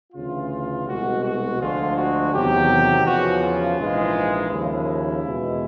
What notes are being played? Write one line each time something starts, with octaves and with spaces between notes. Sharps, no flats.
D2 C#3 E3 F4
C2 B2 G#3 F#4
F#4
D2 D3 F3 G#3 F4
F#4
E2 C3 D#3 F#3 G4
E2 C#3 F3 F#4
F4
A#1 G#2 E3 G#3
D#2 C#3 F3 E4
E2 B2 G#3